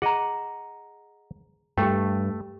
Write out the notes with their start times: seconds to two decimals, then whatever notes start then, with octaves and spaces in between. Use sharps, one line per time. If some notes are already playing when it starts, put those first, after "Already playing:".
0.02 G#4 D#5 F#5 A#5
1.78 G2 A3 G4 G5